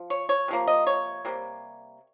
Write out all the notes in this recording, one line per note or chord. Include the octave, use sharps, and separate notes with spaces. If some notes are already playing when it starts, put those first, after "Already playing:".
Already playing: F3
C#5
C#5
C3 F3 A#3
D#5
C#5
C3 G3 A#3